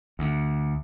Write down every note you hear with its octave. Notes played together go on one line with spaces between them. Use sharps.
D2